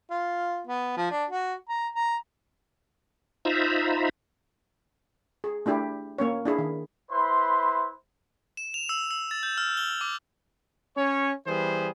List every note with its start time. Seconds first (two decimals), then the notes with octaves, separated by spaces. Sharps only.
0.10 F4
0.67 B3
0.97 F3
1.11 D4
1.30 F#4
1.69 A#5
1.95 A#5
3.45 D#4 F4 C5 E5 A#5 B5
5.44 G#4
5.66 A3 D4 E4 G4
6.18 A#3 C#4 C#5
6.45 D4 E4 G#4
6.58 D#3
7.11 E4 B4 C5 C6
8.57 E7
8.74 F7
8.89 E6
9.11 E6
9.31 A6
9.43 G6
9.58 F6
9.77 G7
10.01 D6
10.97 C#4 C#5
11.47 E3 G3 B3 G#4 C5